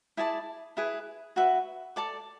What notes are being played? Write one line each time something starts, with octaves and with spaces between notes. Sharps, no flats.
E4 G#4 D5 A5
E4 G#4 B4
F#4 B4 E5
A4 D5 A5 D6